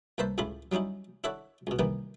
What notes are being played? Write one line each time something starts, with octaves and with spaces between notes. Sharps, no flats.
C2 A#3 B4 C5 E5 A5
C#2 A2 E4 F4 B5
F#3 G3 C#4 D#4 E4
D4 E4 A4 C#5 E5 F#5
C#2 B2
C3 D#3 E3 G3 A#3 B3